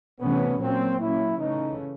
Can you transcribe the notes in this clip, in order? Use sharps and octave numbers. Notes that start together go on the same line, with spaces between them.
C3 E3 A3 B3 C#4
A#2 F#3 A#3 C4 C#4
A#2 F#3 A#3 C#4 E4
C#3 E3 A3 C#4 D#4